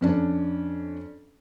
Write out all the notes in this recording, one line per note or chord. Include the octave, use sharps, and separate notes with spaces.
F2 C#4 D4